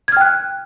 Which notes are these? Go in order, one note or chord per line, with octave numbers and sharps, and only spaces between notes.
G5 F6 F#6 G#6